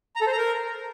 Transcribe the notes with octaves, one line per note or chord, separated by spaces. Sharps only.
A#5
A4
C5
A#5
A#4